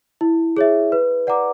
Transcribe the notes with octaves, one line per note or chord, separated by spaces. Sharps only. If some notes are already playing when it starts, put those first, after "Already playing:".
E4
G#4 C#5 E5
B4
D5 F#5 A#5 D6